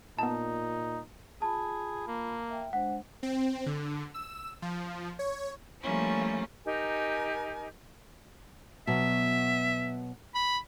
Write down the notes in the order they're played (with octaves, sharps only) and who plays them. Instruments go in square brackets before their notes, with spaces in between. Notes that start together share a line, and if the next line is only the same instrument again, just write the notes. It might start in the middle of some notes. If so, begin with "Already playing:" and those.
[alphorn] A#2 [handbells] B3 A5 [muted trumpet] D#4
[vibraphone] F4 B5 [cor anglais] G#4 [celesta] A5
[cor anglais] A#3
[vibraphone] E5 G5
[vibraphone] G#3 D4 C5 [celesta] F#5
[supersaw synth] C4
D3
E6
F3
C#5
[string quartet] F3 G3 A3 A#3 C#4 E4
[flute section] D#4 G4 A#4 G#5
[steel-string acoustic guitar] B2 F#3 [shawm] E5
[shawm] B5